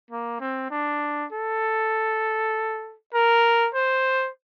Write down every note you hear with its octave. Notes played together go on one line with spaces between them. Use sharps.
A#3
C4
D4
A4
A#4
C5